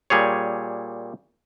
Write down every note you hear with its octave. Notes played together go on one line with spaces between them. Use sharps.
A#2 G3 G#4 C#5